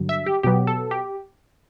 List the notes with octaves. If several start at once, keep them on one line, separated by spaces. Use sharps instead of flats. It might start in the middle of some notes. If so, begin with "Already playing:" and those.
Already playing: G2 D3 F#3
E5
G4
B2 F#3 B3 G4
A4
G4